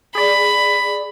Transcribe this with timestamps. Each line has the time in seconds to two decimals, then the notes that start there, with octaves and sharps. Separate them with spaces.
0.15 G#4 D5 B5